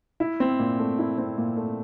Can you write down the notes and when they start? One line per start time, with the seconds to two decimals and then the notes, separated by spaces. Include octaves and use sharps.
0.20 E4
0.40 C4
0.60 A#2
0.79 A3
0.99 E4
1.18 C4
1.38 A#2
1.57 A3